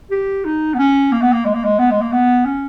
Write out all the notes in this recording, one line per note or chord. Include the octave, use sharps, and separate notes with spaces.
G4
D#4
B3
C#4
A#3
B3
A#3
G#3
A#3
G#3
B3
G#3
A#3
B3
C#4